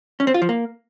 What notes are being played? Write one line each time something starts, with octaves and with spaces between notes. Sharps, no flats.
C#4
C4
F4
F3
A#3